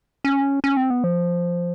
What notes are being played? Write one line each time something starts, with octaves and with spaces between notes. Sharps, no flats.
C#4
C#4
C4
B3
F3